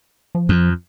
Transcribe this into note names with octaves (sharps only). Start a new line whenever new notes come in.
F3
F2